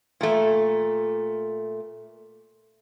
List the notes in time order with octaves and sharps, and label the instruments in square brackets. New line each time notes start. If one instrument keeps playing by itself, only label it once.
[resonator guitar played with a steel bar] A#2 A3